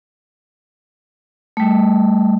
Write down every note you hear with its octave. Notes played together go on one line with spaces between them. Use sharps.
G3 A3